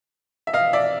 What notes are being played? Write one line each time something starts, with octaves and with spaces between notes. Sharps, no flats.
E5
D#5 F5
D5 E5